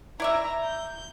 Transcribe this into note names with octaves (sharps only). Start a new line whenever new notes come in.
E4 D5 E5 A#5
G6